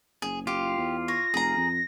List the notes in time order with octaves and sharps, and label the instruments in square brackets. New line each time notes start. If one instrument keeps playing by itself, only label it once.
[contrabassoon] F#1 [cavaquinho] G#4
[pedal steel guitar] F4 [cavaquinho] G4
[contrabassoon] E2
[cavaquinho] C#5 [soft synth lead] A#6
[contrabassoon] F1 [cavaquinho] G#4 A#5
[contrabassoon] F2